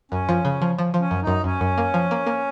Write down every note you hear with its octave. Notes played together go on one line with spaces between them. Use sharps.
F#2 C#4
F3
C#3
F3
F3
F3
C#4
F#2
D#4
F#2
F#2 C#4
F#2
A#3
F3
A#3
A#3